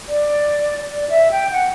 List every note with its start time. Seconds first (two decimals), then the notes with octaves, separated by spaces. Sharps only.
0.08 D5
0.88 D5
1.10 E5
1.31 G5
1.52 F#5